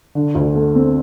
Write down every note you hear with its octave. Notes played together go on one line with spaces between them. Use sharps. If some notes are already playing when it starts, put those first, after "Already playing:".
D3
D2
A3
C4